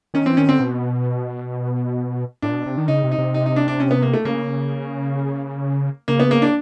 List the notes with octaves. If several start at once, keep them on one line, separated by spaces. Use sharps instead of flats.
D#3 C#4
E3 C4
D#3 C#4
D3 C4
B2
A2 D4
A#2
B2
C3
D#3
C#3 D#4
C3
D#4
C3
D#4
D#4
D4
D4
C#4
B3
A#3
A3
C#3 A#3
C#3 A#3
B3
A#3
D4